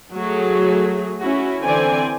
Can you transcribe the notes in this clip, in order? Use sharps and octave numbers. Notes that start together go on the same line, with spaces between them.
F#3 A3 G#4
C#4 E4 F#4
D3 E3 C4 C5 D5 G#5